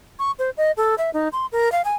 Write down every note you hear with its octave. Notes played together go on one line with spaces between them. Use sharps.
C#6
C5
D#5
A4
E5
D#4
C6
A#4
F5
G#5